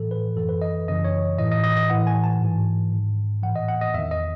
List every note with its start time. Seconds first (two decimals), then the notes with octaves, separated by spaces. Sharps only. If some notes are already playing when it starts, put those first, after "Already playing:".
Already playing: A2 E3 A4
0.11 B4
0.36 F#2 E3 A4
0.49 B4
0.62 D#5
0.88 F#2 C#3 E3 D#5
1.04 C#5
1.39 A2 E3 D#5
1.51 D#5
1.64 D#5
1.77 D#5
1.90 A2 E3 F#5
2.07 G#5
2.24 A5
2.40 G#2 E3
2.92 G#2 D#3
3.43 A2 E3 F#5
3.56 D#5
3.68 F#5
3.81 D#5
3.94 E2 D#3 E5
4.11 D#5